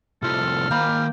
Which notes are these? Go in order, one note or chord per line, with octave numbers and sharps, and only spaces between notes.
C2 F3 A4 F6
D#3 A#3 G5 B5